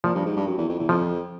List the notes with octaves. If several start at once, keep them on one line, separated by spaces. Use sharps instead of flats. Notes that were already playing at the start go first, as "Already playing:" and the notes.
A#2 F3
G2
G#2
G2
F#2
E2
F2
E2
F2 F3